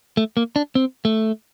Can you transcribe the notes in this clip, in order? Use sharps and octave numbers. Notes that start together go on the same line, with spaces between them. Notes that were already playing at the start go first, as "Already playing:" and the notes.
A3
A#3
D4
C4
A3